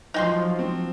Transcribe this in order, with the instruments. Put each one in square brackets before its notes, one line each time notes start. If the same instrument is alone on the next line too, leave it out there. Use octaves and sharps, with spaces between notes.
[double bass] F3 F#3 [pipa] D#4 G5 C6
[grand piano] C4